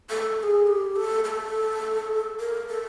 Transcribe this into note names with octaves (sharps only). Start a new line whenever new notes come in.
A4
A4
G#4
G4
A4
A4
A#4
A4